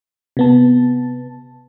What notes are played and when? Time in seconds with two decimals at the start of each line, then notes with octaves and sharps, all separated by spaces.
0.37 C3 B3 A5